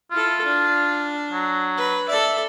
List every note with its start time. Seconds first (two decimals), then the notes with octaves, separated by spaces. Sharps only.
0.11 E4 F4 A4
0.44 D4
1.33 F#3
1.77 B4
2.08 A4 D5 E5